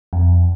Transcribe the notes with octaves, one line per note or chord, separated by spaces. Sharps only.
F2